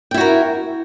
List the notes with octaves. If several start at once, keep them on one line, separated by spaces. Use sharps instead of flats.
E4 F#4 A#4 G5